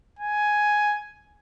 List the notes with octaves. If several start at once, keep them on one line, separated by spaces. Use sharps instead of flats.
G#5